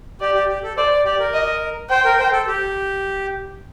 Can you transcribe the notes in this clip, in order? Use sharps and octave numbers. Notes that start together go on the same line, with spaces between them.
G4 D5
G4
G4
A4
C5 D5
D5
G4 D5
A#4
D#5
C5 G5
A#4
C5
A4
G4